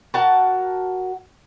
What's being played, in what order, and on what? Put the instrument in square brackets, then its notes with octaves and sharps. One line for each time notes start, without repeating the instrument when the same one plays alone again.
[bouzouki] F#4 A#4 F#5 A5